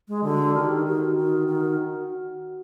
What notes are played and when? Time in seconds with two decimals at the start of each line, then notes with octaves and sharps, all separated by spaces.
0.08 G#3
0.24 D3 F#4
0.54 D#3 G4
0.86 D#3 F#4
1.17 D#3
1.48 D#3